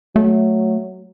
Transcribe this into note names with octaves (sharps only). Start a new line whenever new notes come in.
F#3 A3